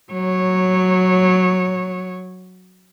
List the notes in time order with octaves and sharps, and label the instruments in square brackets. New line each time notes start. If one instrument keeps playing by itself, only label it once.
[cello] F#3 C#5